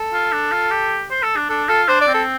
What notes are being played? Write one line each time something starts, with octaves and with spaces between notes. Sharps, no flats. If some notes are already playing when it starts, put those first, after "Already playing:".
Already playing: A4
F4
D4
F4
G4
C5
A4
D4
D4 A4
F4 A4
D4 C5
D5
C4
A4